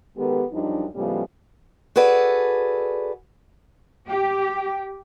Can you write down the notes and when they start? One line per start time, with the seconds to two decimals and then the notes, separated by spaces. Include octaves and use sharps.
0.17 D#3 G#3 B3 G4 A4 B4
0.52 F#2 F3 G3 D4 D#4
0.95 A2 C#3 F3 G3 G#3 B3
1.96 F#4 G#4 A4 B4 D5
4.08 G4